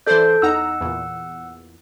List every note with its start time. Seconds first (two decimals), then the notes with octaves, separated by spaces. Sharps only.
0.07 E3 A4 C5 D5 G6
0.42 E2 D#4 F#5 A#5 E6
0.81 E2 A#2